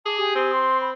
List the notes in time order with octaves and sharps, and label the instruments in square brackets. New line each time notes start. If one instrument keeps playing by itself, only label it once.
[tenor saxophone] G#4 [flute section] A5 D6
[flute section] G4 G#5 D#6
[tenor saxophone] C4
[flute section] C6
B5